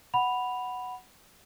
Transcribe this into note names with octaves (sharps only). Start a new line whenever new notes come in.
F#5 B5 F7